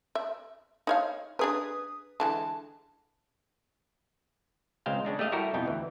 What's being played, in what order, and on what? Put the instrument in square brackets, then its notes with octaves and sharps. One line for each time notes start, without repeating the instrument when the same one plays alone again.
[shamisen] E5
D#4 C#5 F5
[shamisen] D4 G#4 A#4 [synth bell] B4 D#6
[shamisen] D3 E3 G#3 [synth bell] A5
[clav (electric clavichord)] C#2 G#3 C4 C5 F5 G5
C#3 G#3 D4 D#4
A3 G4 D#5 F5
G3 E4 F#4 G4 A4 A#4
F2 B2 D#4 E4 G5
D2 E3